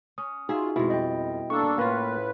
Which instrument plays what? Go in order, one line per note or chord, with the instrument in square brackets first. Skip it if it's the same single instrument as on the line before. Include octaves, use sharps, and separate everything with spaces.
[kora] C#4 [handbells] D#6
[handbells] D#4 F#4 [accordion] F4 [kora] G#4 E5
[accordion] F2 [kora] B2 G#3 [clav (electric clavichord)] E4
[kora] G3 [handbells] D#5 G5
[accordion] A#3 D4 A4 [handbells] C#6
[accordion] A2 B4 [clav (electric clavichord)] A#3 [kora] C#4 F4